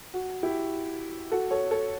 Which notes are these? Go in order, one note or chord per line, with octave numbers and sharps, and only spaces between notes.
F#4
E4 G4
F#4 A4
A4 C#5
A4 C#5